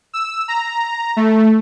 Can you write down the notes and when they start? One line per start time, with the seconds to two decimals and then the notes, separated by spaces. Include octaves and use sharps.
0.13 E6
0.48 A#5
1.17 A3